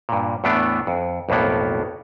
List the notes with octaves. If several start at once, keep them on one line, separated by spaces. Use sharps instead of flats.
G2 A#2
E2 A2 A3 B3 D4
F2
B1 F2 A2 A#3 B3